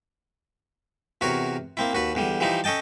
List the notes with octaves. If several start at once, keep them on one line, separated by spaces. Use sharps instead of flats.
E2 C3 F#4 A#4 C#5
A#3 C4 E4
D#2 F#4 B4
E2 D3 G3
E3 F3 G3 D#4 E4
C#4 A4 D#5 G5 A5